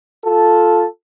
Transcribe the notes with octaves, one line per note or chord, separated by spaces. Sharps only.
F4 A4